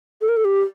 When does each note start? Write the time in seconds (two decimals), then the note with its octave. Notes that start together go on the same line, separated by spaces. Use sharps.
0.21 A4
0.28 A#4
0.37 A4
0.45 G4